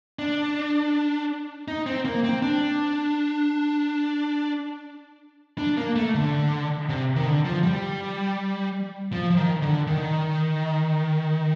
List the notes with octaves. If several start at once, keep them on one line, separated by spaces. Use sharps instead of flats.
D4
D#4
C4
A#3
C4
D4
D4
A#3
A3
D3
C3
D#3
D3
F3
G3
F3
F3
D#3
D3
D#3